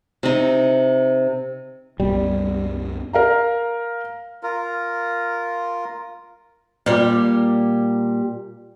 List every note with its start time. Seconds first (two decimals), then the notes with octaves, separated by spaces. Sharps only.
0.23 C3 D#4
2.00 C2 F#2 G3 B3
3.13 A#4 F5 A#5
4.43 F4 A#4
6.86 A#2 G3